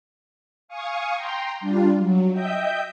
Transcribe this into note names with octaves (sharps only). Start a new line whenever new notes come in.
F5 G#5 C#6 D#6
G5 A#5 C6
G3 D4 F4
F#3
D#5 E5 G5 G6